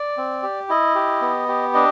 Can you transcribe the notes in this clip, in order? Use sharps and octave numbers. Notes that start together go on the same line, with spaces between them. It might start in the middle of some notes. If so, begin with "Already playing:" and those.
Already playing: D5
C4
G4
E4 D#5
G4
B3
G4
D4 D#5